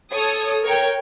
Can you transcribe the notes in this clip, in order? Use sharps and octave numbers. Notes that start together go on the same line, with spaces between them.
A4 C#5 D#6
A#4 C#5 G5